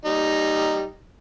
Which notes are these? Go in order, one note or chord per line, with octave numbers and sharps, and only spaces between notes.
G3 D#4